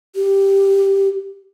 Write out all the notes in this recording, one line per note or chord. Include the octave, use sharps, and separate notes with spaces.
G4